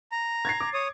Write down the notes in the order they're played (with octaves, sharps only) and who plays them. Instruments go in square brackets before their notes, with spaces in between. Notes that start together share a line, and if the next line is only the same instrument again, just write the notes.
[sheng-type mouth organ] A#5
[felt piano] G#6 A6 C7
D6
[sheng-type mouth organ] C#5 D#6